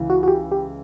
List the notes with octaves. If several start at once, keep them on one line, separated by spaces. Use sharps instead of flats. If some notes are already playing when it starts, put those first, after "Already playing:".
Already playing: C#2 C#3 E3
F#4
F#4
G4
G4